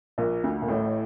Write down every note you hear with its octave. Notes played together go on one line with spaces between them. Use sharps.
A#1 A#2
D2 D3
A#2
A1 A2